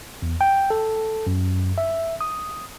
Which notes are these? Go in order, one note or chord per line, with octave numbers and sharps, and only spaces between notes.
E2
G5
A4
F#2
E5
D#6